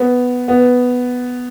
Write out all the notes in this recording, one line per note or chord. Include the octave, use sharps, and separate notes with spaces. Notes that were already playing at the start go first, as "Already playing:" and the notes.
Already playing: B3
B3